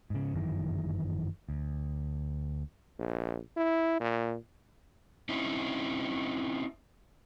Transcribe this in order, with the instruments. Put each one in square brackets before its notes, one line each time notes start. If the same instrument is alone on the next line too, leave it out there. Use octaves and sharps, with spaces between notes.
[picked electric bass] G#2 C#3
G1 F#2 D#3 E3
D2
[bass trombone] A#1
E4
A#2
[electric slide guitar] C4 C#4 D#4 E4